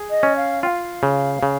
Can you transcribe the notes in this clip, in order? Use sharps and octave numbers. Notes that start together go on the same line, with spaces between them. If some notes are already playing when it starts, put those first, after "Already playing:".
Already playing: G#4
D#5
C#4
F5
F4 F5 G5
C#3
C#3